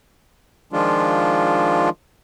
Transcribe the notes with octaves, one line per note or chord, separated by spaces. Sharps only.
D#3 F3 G#3 D4 F4